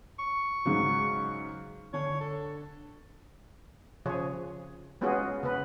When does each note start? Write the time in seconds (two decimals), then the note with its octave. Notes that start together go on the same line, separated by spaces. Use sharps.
0.19 C#6
0.66 G#2 C#3 F#3
1.94 D3 D4 C#5
2.21 A4
4.06 C#3 F3 G#4 C#5
5.01 G#3 B3 C#4 F4 F#4 G#4
5.43 C#3 B3 B4